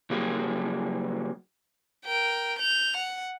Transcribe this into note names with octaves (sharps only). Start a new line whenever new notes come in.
C#3 F#3 G3 A#3 G#4
A#4 G5
G6 F7
F#5